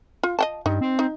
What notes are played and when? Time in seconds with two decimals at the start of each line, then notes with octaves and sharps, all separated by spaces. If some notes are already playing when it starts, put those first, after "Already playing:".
0.23 F4
0.39 D#5 G5 A5
0.66 G2 D#4
0.81 C4
0.99 D#4